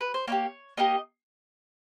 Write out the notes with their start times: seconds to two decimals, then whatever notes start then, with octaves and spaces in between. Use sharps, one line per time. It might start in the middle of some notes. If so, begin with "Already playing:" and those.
0.01 B4
0.14 C5
0.28 A#3 D#4 G4 C#5
0.77 A#3 D#4 G4 D#5